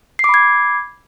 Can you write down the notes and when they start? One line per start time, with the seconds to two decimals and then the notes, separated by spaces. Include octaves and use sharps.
0.19 C7
0.24 D6
0.29 B5
0.34 G#6